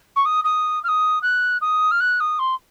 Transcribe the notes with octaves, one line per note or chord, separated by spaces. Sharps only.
C#6
D#6
D#6
F6
D#6
F#6
D#6
F6
F#6
D#6
C6